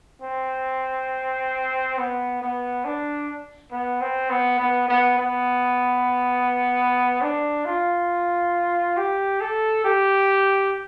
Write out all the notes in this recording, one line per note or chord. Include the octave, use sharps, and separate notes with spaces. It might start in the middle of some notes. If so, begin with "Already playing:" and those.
C4
B3
B3
D4
B3
C4
B3
B3
B3
B3
D4
F4
G4
A4
G4